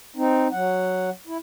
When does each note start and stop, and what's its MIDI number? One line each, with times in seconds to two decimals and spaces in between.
0.16 0.48 60
0.16 0.48 63
0.52 1.10 54
0.52 1.10 78
1.27 1.37 64